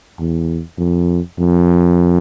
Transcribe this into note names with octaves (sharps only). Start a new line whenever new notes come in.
E2
F2
F2